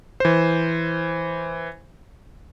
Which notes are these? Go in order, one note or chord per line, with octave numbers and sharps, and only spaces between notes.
E3 C5